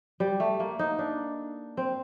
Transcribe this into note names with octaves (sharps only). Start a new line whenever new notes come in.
G3
A3
A#3
D#4
D4
C4